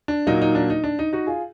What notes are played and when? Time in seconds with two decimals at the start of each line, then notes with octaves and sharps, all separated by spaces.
0.08 D4
0.27 A#2 F#3 A#3 D#4
0.42 D#4
0.55 D4
0.70 D#4
0.84 D4
0.99 D#4
1.13 D#4 F#4
1.27 F4 G#4